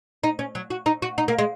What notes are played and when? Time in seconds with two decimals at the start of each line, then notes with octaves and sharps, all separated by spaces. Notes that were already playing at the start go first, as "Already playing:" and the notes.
0.23 D#4
0.39 C#4
0.55 F#3
0.70 F#4
0.86 D#4
1.02 F#4
1.18 D#4
1.28 A#3
1.39 G#3